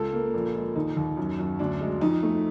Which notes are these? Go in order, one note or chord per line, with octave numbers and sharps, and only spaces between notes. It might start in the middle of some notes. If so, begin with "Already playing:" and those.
Already playing: C#2 A4
A#3
A#1
G#3
D#2 D#4
D#2
F#2
F#2
D2 D4
G#3
F2 D#4
A3